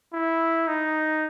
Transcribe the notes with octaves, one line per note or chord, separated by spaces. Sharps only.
E4
D#4